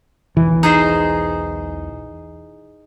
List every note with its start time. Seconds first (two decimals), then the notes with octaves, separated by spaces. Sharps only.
0.37 E1 B1 E3
0.63 D#4 G#4 C5